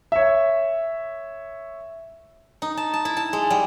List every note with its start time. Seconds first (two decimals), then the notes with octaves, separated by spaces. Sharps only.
0.12 C#5 E5
2.62 D#4
2.77 A5
2.93 A5
3.05 E4
3.17 A5
3.33 G#3
3.50 G3